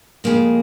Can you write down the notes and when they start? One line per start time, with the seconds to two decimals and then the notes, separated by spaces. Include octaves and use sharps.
0.24 F2 C#3 G#3 A#3